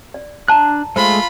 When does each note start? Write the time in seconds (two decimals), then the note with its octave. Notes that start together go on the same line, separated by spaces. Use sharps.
0.14 D5
0.48 D4 D5 A5 A#5 F#6
0.96 G#3 A3 F4 C5 B5